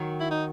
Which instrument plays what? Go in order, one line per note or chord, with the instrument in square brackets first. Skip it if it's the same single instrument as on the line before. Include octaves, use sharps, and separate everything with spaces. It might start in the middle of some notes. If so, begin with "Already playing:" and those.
Already playing: [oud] D#3 F#3
[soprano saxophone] E4
D#4